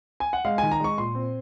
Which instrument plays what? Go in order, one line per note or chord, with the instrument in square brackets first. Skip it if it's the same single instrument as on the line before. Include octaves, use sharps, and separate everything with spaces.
[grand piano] G#5
F#5
G#3 F5
D#3 G#5
A#5
G#3 C#6
A#2 C6
C4